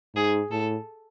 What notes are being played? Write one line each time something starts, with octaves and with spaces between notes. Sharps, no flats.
G#2 G#4
A2 A4